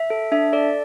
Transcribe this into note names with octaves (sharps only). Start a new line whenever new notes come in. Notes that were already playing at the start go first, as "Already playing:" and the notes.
Already playing: E5
A4
D4 E5
A4 D5